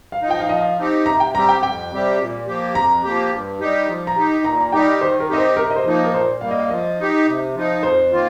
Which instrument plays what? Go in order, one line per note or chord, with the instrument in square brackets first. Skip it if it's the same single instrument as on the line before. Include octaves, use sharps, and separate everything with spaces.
[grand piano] F5
[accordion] F3 D#4
[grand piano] G5
F5
[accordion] F3 [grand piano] D#5
[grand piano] F5
[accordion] C4 D#4 G4
[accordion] C3 [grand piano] A#5
[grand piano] G5
[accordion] G3 C4 G4 [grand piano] A#5
[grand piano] G5
[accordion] F2 [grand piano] G5
[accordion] C3 G3 C4 G4
A#2
F3 A#3 G4
[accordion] F2 [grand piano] A#5
[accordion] F3 A#3 G4
G2
G3 D#4 G4
F3
[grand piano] A#5
[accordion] D#4 G4
[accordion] A#2 [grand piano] A#5
[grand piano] A#5
[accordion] G3 D#4 G4 [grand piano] G5
[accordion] D#3 [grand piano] C5
[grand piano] A#4
[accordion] C4 D#4 G4 [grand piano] D#5
[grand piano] C5
[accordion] C3 [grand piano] A#4
[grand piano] D#5
C5
[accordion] F3 A#3 D#4
[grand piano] A#4
[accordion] A#2 [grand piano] C5
[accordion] G3 A#3 [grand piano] F5
[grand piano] D#5
F5
[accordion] F3 [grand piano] D#5
[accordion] D#4 G4
C3
F3 D#4
[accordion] F2 [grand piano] C5
[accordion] D#3 A#3 F4